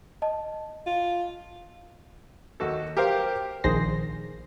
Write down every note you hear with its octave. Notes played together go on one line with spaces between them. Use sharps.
D#5 A5
F4
D#2 F#4 A4
G4 A#4 C5 F5
A#1 D#3 G#4 C5 A#6 C7